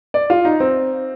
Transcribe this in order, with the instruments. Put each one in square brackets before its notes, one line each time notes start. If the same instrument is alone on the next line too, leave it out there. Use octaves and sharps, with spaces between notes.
[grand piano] D5
F4
D#4
C4